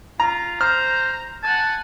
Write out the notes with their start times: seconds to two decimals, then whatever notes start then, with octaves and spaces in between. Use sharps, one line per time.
0.20 F4 A#5
0.61 C5 A#5 F6
1.43 F#5 G#5 A5